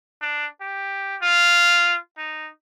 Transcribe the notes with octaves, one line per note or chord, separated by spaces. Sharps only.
D4
G4
F4
D#4